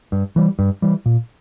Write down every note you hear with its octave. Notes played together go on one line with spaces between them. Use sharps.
G2
E3 G3
G2
E3 G3
A#2